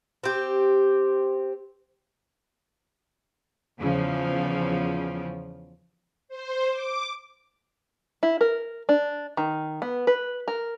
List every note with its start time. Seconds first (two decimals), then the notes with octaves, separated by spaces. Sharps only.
0.24 C4 G4
3.80 E2 C#3 F3
6.29 C5
6.70 D6
8.23 E4
8.41 A#4
8.89 D4
9.37 D#3
9.82 B3
10.07 B4
10.48 A#4